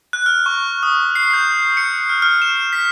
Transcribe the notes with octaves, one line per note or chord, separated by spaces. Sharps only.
F#6
F6
C#6
D#6
C7
G6
C#7
F6
F6
E7
B6